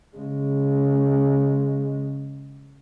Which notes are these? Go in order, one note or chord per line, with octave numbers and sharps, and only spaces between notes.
C#3 G#3